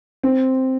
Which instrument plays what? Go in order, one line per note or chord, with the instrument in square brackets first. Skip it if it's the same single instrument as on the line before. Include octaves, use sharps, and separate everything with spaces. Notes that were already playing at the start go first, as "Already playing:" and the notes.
[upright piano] C4